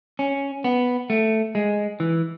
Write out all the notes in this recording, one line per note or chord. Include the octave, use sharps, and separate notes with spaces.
C#4
B3
A3
G#3
E3